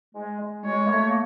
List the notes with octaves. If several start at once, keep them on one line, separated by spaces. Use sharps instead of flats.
G#3
G#3
G#3 C#5
A#3
A3
A#3